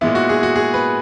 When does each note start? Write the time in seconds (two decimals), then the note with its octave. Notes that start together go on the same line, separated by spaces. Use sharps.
0.01 A#2 G#3 B3 E4
0.15 F#4
0.29 G#4
0.43 F#4
0.56 G#4
0.74 B4